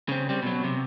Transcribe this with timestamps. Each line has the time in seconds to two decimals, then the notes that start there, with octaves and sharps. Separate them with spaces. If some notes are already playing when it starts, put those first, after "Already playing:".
0.09 C#3 C4
0.29 G3 C4
0.42 B2 F#3
0.64 C3